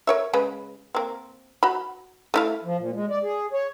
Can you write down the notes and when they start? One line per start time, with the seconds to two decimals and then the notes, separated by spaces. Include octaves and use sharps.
0.07 A#4 C#5 E5
0.33 C#3 G#3 B4
0.95 A#3 C4
1.63 F#4 B5
2.34 A3 E4 F5
2.64 F3
2.77 A#2
2.93 G#3
3.10 D5
3.23 G#4
3.53 C#5